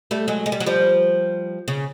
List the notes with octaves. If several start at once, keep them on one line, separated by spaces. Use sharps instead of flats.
G3 A3
F#3 G#3
G#3
G3
F#3
F3 G3
C#3